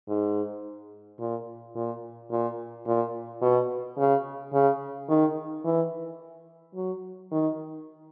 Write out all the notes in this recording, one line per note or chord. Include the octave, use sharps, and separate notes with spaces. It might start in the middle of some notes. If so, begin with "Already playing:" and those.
G#2
A#2
A#2
A#2
A#2
B2
C#3
C#3
D#3
E3
F#3
D#3